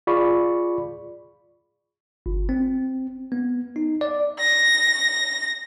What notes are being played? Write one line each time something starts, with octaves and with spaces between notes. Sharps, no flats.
F4 G#4 D5 B5 C#6
G1
C4
B3
D#4
D5
A#6